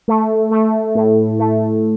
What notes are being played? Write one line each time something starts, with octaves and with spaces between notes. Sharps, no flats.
A3
A3
A2
A3